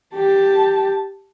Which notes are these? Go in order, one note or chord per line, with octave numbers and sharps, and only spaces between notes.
G4 A5